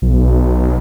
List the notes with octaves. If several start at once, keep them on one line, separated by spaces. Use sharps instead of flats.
B1